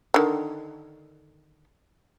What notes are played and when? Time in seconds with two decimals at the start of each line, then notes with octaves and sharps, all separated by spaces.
0.14 D3 D#3